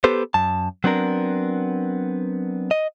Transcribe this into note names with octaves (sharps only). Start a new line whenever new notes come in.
B3 G4 A4 B4 C5
F#2 A5
F#3 B3 C4 D4 A#4
D#5